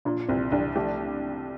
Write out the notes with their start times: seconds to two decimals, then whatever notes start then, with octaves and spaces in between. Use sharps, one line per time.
0.05 A#2 D4
0.28 C2 C4
0.52 C2 D4
0.75 A3 G4